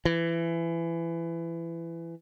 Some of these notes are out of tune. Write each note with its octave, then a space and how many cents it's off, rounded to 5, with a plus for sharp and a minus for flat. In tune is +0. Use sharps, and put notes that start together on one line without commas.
E3 +20